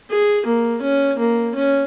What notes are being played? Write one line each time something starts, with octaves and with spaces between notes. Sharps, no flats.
G#4
A#3
C#4
A#3
C#4